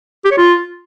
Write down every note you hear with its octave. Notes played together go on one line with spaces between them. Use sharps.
G4
C#5
F4